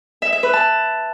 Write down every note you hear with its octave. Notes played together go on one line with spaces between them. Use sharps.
E5
E5
B4
A5